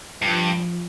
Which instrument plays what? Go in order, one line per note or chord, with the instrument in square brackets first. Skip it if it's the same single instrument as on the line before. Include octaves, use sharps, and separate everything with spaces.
[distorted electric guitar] G2 [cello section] F3